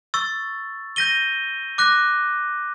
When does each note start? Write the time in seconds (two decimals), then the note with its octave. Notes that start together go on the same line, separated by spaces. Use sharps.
0.14 C#6 E6 A6
0.96 G6 A#6 D#7 G7
1.78 D6 F#6 A#6